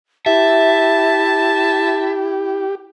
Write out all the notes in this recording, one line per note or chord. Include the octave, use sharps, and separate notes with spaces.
E4 G4 E5 A5